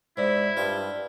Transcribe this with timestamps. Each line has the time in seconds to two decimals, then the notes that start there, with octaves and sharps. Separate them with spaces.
0.17 G#2 E4 C5 D5
0.57 G2 F4 G5